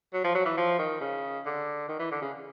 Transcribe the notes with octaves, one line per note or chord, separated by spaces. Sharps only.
F#3
F3
F#3
E3
F3
D#3
C#3
D3
D#3
E3
D3
C#3